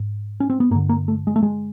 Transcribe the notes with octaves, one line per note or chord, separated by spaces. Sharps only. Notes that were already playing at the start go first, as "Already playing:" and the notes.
Already playing: G#2
C#4
C4
B3
G2 D3 A#3
A#3
A3
G#3
A3
G#3